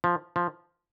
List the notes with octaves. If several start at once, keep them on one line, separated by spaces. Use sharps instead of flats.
F3
F3